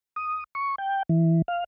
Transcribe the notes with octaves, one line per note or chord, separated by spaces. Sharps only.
D#6
C#6
G5
E3
F5